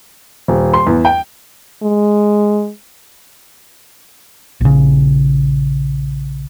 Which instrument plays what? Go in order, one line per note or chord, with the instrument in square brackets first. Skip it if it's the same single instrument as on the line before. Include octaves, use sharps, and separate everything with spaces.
[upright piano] D#1
C6
E2
G5
[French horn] G#3
[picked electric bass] A#1 C#3